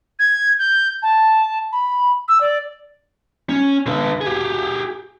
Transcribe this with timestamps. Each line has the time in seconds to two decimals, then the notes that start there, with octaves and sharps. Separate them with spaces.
0.19 G#6
0.59 G6
1.02 A5
1.72 B5
2.28 E6
2.40 D5
3.49 C#4
3.86 D3 B4
4.21 G4 G#4